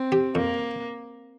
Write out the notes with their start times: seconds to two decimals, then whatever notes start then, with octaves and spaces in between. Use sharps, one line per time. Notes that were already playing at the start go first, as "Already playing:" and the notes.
Already playing: C4
0.12 G4
0.35 F2 A#3